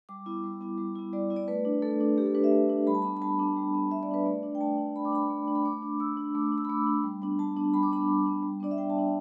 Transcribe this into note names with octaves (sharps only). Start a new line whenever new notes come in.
G3 D6
B3 E4
G3
B3 E4
G3
B3 E4
G3 D5
B3 E4
D5
A3 B4
D4
A3 A4
D4
A3 G4
A4
D4 B4
E5
A3
D4
G3 B5
A5
B3 D4 B5
B5
G3 A5
B3 D4
G3
B3 D4
G3 E5
D5
B3 D4 B4
A3 D5
D4
G5
A3 A5
D4
A3 B5
D6
D4 B5
A3
D4
B5
A3 D6
D4
A3 E6
D4
A3 D6
D6
D4
E6
B5
A3 D6
D4
G3
B3 D4
G3 A5
B3 D4
G3 B5
D6
B3 D4 B5
G3
B3 D4
G3
B3 D4 D5
E5
G3 G5
A5
B3 D4